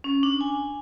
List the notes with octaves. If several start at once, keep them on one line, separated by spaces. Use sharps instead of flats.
C#4
D4
G#5